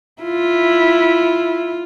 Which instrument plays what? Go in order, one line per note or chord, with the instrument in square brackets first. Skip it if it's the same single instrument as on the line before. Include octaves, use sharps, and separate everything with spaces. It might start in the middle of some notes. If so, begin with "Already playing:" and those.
[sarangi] E4 [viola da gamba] F4